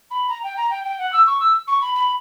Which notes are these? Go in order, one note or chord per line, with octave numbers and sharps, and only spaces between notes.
B5
A#5
G5
A#5
G5
G5
F#5
E6
C#6
E6
C#6
B5
B5